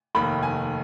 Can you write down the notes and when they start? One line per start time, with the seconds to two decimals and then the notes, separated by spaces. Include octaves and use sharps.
0.15 F1 D#2 D#3 B5
0.43 G#5